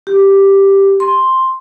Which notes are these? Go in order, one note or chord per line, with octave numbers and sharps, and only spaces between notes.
G4
C6